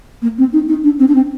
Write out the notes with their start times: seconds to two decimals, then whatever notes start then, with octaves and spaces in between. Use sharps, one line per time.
0.22 A#3
0.38 C4
0.53 D#4
0.68 D#4
0.84 D4
0.99 C4
1.08 D4
1.15 C4